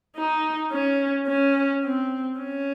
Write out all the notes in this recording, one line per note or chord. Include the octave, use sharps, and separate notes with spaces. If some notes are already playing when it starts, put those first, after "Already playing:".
D#4
C#4
C#4
C4
C#4